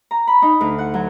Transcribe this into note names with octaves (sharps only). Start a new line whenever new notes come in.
A#5
B5
D#4
D2
F#5
F#3